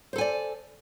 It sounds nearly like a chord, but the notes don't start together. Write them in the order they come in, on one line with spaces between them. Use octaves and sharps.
C5 A4 G#5 D5